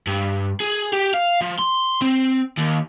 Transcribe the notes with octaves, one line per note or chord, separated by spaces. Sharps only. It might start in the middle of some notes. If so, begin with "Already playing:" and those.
G2
G#4
G4
F5
F3
C6
C4
D#2